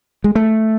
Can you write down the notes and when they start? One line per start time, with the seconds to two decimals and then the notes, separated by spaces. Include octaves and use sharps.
0.24 G#3
0.35 A3